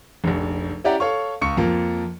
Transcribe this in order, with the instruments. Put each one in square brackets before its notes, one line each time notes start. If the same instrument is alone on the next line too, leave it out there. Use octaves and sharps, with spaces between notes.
[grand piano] F1 A#1
C#4 E4 G4 D5 F#5 A#5
A4 C#5 F5 C#6
C#2 C#6 C#7
F2 F3 A#3